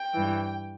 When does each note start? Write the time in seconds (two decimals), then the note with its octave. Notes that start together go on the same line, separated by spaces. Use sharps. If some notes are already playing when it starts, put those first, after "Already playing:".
Already playing: G5
0.14 G2 E3